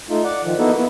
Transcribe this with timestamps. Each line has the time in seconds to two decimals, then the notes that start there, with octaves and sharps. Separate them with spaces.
0.09 A3 D#4 F4
0.24 D5 F#5
0.43 D#3 F3
0.59 A#3 B3 D#4 E4 F#4 A4
0.76 B3 E4